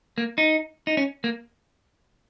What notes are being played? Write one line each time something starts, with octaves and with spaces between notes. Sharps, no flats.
A#3
D#4
D#4
C#4
A#3